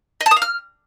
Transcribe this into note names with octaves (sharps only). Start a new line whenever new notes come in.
D#5
A5
D#6
F5
F6